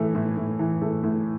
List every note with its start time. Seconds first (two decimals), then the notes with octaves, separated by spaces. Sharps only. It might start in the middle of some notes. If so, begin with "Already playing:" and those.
Already playing: A2 E3 A3
0.15 A2
0.37 A2
0.59 E3
0.82 A3
1.04 A2